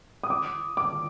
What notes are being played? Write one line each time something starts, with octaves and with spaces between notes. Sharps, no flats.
D#6
D6
D6